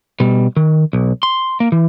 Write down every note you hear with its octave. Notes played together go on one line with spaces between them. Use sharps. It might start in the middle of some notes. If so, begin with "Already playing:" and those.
B2 G3
D#3
B1
C6
A#3
E3